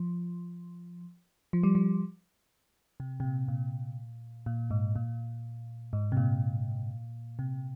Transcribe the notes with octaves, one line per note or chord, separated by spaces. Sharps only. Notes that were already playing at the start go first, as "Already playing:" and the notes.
Already playing: F3
F3
G3
F3
C3
C3
A#2
A#2
A#2
G#2
A#2
G#2
C3
A#2
C3